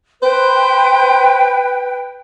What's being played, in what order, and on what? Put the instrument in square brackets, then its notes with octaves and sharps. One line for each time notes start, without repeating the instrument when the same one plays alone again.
[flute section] B4 G5 [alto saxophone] C5